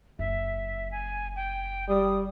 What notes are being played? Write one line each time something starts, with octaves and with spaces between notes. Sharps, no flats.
F#1 E5
G#5
G5
G3 D#6